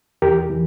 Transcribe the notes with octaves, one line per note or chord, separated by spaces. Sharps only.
E2 G4 A#4
E3